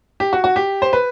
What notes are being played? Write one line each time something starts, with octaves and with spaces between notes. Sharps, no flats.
G4
F#4
F#4
G4
C5
B4